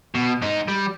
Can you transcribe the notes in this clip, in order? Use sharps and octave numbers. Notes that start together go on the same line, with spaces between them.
B2
G#2 D#4
G3